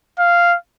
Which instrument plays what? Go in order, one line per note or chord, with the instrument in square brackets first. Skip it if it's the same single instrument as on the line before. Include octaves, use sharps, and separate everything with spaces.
[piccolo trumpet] F5